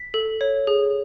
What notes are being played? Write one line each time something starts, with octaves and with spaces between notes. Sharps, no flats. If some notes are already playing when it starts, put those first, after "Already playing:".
Already playing: B6
A4
C#5
G#4